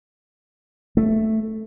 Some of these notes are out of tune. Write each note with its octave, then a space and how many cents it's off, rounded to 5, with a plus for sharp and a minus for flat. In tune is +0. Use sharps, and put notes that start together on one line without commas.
A3 +0